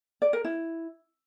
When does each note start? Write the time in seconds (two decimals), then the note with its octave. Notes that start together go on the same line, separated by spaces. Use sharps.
0.22 D5
0.33 A#4
0.45 E4